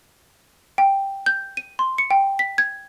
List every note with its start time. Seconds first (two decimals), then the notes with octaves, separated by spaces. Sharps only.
0.78 G5
1.26 G6
1.57 D#7
1.79 C6
1.98 C#7
2.11 G5
2.39 B6
2.58 G#6